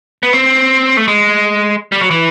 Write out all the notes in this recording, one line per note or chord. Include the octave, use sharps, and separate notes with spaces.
B3
C4
A3
G#3
G3
F#3
E3